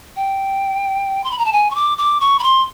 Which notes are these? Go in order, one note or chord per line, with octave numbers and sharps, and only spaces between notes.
G5
C6
B5
A#5
A5
G#5
C#6
D6
D6
C#6
B5
C6